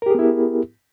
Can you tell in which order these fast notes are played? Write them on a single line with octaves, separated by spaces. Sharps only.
A#4 G4 G#4 B3 E4